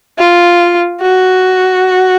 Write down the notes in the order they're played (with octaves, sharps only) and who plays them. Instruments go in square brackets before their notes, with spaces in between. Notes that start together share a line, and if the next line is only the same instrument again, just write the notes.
[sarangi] F4
F#4